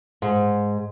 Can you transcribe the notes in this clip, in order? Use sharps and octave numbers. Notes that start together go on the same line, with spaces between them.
G#2